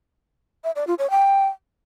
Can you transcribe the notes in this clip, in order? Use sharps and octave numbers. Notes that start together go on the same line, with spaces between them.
E5
D5
F4
C#5
G5